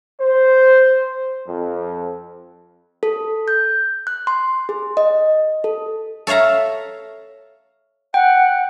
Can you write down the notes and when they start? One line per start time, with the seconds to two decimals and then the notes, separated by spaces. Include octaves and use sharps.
0.20 C5
1.47 F2
3.03 A4
3.48 G6
4.07 F#6
4.27 C6
4.69 G#4
4.97 D#5
5.64 A4
6.27 A4 C#5 E5 F5 A#5
8.14 F#5 G5